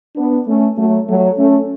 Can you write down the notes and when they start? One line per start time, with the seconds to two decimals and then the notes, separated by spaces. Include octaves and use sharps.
0.16 B3 D4
0.46 A3 C#4
0.77 F#3 A3
1.07 F#3 A3
1.37 A3 C#4